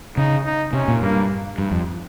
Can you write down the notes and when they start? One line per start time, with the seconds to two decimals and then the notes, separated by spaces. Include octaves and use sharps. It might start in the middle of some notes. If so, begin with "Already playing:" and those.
0.17 C#3 D#4
0.45 D#4
0.73 C3 C#4
0.88 A#2
1.02 G2 A#3
1.58 G2
1.71 F2